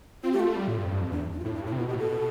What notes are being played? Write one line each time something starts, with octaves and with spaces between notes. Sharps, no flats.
C4 F4
A3 G4
F4
A3
G3
A2
G2
F2
G2
F2
E2 D4
D4
F4
A2 E4
G2 E4
A2 E4
C3
B2 F4
B2 G4
A2
B2 A4